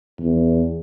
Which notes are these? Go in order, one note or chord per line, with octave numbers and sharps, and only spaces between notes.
E2